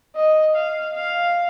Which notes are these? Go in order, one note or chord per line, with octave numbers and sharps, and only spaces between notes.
D#5
F5
F5